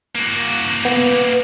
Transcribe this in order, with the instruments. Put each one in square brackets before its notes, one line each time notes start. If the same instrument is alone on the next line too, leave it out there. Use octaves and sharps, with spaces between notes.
[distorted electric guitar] A#3 F#4
[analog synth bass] B3